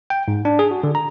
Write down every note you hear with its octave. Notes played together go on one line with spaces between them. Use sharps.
G5
G#2
D4
G#4
F#4
D3
A#5